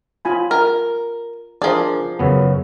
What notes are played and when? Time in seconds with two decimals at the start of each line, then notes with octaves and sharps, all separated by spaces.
0.25 F4 G#5 B5
0.51 A#4
1.62 F3 D4 G#4 A#4 D5
2.19 F#2 C#3 B3